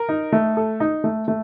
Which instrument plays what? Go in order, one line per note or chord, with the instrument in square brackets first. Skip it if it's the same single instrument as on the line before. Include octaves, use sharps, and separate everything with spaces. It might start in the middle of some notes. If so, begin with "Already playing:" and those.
Already playing: [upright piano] A#4
D#4
A3
A4
D#4
A3
A3